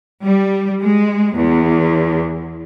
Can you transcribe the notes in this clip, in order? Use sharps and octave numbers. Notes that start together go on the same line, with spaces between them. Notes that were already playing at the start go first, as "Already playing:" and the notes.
G3
G#3
E2